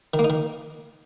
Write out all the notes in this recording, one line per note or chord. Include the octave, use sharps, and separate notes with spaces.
D#3
A#3
D#4
D#3